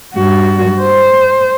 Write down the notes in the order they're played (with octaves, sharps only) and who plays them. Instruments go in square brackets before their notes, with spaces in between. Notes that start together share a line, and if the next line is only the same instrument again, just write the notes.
[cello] G2 F#4
C5